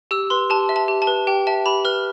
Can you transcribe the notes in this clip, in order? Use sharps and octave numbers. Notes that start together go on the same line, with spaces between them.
G4 E6
B4 C6
G4 A5
E5
A5
G4
A5
B4
G4 G5
E5 A5
G4 B5
B4 F6